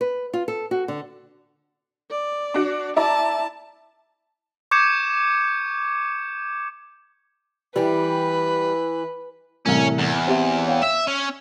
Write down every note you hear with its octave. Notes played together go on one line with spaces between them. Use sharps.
B4
F4
A4
F#4
D3
D5
D4 F#4
E4 D5 A5 A#5
C#6 D6 G6 G#6 C#7 E7
E3 G3 G4 B4
C2 A2 E3 C#4
E2
C4 G4 E5
C#5 F5 G5
E5 E7
C#4